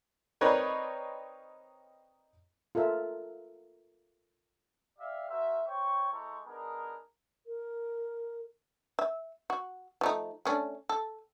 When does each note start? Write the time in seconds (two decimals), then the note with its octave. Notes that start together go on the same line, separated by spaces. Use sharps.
0.41 C4 D#4 A#4 B4 C#5 D5
2.75 F4 A4 A#4 E5
4.99 G4 D5 E5 F5
5.30 F#4 A#4 C5 E5
5.67 C5 C#5 G5 C#6
6.12 G#3 E4 A4 C5 A#5 C#6
6.46 B3 D4 D#4 G#4 A#4
7.46 A#4
8.99 E5
9.50 F#4
10.01 F3 A3 D#4
10.45 A3 C#4 D4
10.89 A4